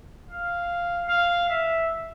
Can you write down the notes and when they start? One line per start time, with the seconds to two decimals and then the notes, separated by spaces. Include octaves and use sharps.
0.30 F5
1.08 F5
1.49 E5